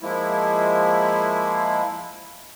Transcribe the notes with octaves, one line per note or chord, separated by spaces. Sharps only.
F3 G#3 A#3 E4